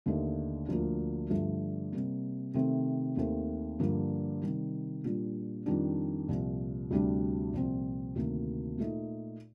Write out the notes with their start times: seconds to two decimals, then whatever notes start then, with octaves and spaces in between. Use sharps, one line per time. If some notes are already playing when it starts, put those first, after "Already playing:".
0.06 D#2 D3 A3 D#4
0.68 D2 D3 F3 A#3
1.30 G2 D3 F3 A3
1.93 C3 G3 A#3
2.54 C3 D#3 A3 C4
3.17 D#2 D#3 A3 C4
3.79 G2 D3 F3 A#3
4.41 C3 D#3 G3
5.04 A#2 G3 D4
5.66 F2 D#3 G3 D4
6.28 C2 A#2 F3
6.90 D2 C3 G3 D4
7.53 C2 A#2 F3 C4
8.15 D2 C3 D#3 A#3
8.77 A#2 A3 D#4